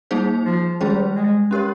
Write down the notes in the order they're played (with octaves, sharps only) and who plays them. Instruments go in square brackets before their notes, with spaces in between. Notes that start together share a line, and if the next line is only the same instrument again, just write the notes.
[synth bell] G3 A#3 D#4 G#4 C5
[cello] F3
[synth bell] D#3 G#3 C#4 G#4 C5 [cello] G3
[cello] G#3
[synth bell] C#4 G4 A#4 C#5